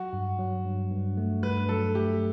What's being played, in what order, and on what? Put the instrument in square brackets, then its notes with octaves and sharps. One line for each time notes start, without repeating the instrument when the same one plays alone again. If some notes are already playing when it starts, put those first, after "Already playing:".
Already playing: [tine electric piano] F#3 [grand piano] F#4
[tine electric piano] G2
F#3
G2
G2
A3
[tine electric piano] G2 [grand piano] B4
[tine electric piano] F#3 [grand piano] A4
[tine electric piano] A3 [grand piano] G4